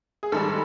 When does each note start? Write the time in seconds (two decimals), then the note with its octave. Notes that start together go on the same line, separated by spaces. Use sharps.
0.23 G#4
0.32 G#2 D#3 G3 A4